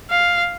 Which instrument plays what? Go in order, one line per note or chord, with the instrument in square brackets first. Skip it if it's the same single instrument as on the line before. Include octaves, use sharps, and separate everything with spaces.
[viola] F5